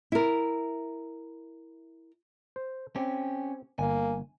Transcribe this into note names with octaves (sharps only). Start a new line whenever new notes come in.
E4 A#4
C5
C4 C#4 G4
G1 A#3 G#5